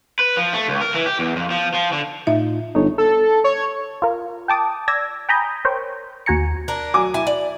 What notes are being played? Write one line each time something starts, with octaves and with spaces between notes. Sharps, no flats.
B4
F3
A3
C#2
A#4
E3
G4
E2
F2
F3
F3
D3
A2 D#4 F4 E5
G1 D#4 A4 C#5
A4
C#5
F4 A#4
G5 A5 D6 D#6
D5 E6 G#6 A#6
G5 G#5 A#5 B5 D#6 G6
A#4 C5 C#5 G5
D#2 F#4 G#5 A#5 C#7
D4 A#4
F#3 G#5 D6
E4 G#5 A5
D5